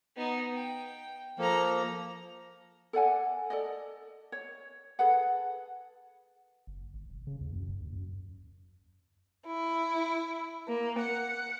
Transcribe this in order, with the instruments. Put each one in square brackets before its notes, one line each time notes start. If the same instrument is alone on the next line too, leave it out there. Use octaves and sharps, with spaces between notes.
[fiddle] B3 D#4
G5
[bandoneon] F3 A#3 [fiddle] A4 A#5
[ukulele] A4 D5 F#5 G#5
A4 D5 D#5
C#5
G#4 A4 B4 F#5
[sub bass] F#1
G1
E1
C#3
D#2
F#2
F1
D#2
F#2
[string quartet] E4
A#3
F#5